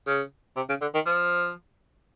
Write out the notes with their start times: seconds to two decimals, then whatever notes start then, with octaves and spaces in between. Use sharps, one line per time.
0.07 C#3
0.56 C3
0.69 C#3
0.81 D3
0.94 D#3
1.06 F3